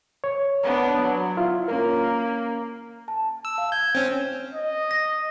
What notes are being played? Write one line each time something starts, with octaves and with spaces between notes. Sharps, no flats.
C#5
B3 D4
F#3
E4 F4
A#3 C#4 A#4
A5
E6
F5
G6 G#6
C4 C#4
D#5
A#6